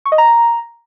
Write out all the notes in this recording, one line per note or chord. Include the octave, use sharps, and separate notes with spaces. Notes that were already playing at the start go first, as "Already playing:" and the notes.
C#6
D#5
A#5